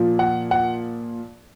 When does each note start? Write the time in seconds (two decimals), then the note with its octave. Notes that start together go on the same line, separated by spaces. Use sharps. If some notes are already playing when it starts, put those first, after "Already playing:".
Already playing: A#2 F3
0.19 F#5
0.51 F#5